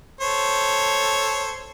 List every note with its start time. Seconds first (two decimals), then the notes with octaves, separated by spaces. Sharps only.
0.21 A4 C5 C#5